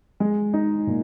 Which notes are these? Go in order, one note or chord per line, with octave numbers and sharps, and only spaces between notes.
G#3
D#4
A#2